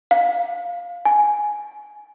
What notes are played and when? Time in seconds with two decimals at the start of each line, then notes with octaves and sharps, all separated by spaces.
0.11 F5
1.05 G#5